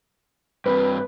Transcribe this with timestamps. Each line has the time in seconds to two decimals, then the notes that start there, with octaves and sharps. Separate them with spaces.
0.66 G2 C4 B4